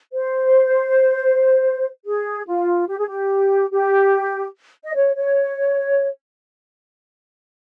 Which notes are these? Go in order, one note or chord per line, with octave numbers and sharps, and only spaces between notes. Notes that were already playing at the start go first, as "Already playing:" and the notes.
C5
G#4
F4
G4
G#4
G4
G4
D#5
C#5
C#5